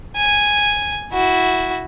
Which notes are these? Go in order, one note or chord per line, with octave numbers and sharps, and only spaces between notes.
G#5
E4 F#4